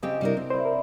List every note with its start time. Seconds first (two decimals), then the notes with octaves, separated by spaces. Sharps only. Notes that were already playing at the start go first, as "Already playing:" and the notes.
0.03 C#3 C4 G4 D#5
0.21 C3 G3 D4 E4 A#4
0.37 C4
0.50 E4 C5 D5
0.65 A#4